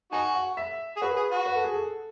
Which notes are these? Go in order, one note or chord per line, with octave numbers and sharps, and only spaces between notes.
D#4 F#4 G#5
F#5
E5
G#4
F#4 B4
G#4
F#4
B4
A4
G#4
A4